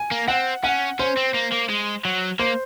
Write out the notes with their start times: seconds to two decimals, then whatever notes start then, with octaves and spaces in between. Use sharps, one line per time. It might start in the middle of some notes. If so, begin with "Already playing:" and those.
Already playing: G#5
0.11 A#3
0.28 C4 F#5
0.63 C#4 F#5
0.99 C#4 C5
1.17 C4
1.34 A#3
1.52 A#3
1.69 G#3
2.05 F#3
2.39 A#3 C5